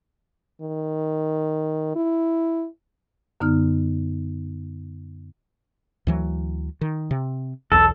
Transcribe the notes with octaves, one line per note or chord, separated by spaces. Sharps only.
D#3
E4
F#2 D3 B3 D#4 F6
D2 E3 F#3
D#3
C3
B1 E2 A4